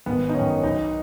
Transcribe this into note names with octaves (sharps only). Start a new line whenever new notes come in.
G#1 B3
D#4
F#2 D#3 C#4
B1 D#4